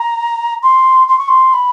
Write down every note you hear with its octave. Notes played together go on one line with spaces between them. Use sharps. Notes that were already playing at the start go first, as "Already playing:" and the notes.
Already playing: A#5
C6
C6
C#6
C6
B5